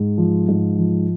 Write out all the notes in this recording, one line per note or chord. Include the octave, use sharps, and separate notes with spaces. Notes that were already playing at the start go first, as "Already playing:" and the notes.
Already playing: G#2
F3
G#2
F3